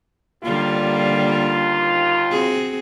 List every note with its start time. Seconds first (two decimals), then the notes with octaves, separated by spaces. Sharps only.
0.43 D#2 D3 G3 A#3 F4
2.31 C4 F#4 G#4